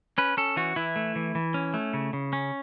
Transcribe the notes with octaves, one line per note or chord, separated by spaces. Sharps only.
C#4 B4
C#4 A4
E3 F#4
E3 E4
A3
E3
E3
C#4
A3
C#3
C#3
C#4